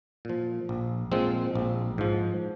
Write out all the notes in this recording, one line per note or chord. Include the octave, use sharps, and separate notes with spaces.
A#2 F3
A#1
A#2 F3 G#3 C4
A#1
G#2 F3